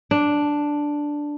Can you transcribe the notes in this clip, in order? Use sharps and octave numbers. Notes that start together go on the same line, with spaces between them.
D4